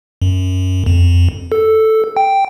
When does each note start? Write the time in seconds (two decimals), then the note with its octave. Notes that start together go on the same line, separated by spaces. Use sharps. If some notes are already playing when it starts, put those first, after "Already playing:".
0.22 F#2
0.86 F2
1.52 A4
2.17 G5